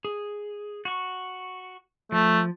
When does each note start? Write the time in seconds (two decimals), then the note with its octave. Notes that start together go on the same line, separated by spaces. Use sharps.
0.05 G#4
0.85 F#4 C#6
2.12 F3 A3